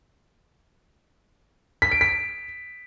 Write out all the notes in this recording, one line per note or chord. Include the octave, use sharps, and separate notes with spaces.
B6
D7
B6